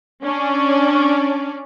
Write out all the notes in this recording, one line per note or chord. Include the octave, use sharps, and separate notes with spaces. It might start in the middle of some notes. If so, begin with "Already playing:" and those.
C#4 D4 D5